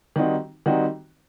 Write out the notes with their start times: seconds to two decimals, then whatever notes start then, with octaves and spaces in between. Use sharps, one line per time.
0.16 D#3 G3 C4 D#4 F#4
0.66 D#3 G3 C4 D#4 F#4